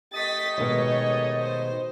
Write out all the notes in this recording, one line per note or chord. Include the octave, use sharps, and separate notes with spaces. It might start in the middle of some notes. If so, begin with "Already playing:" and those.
A3 G4 D#5 A6 B6
B2 D#3 G#3 C#5
C5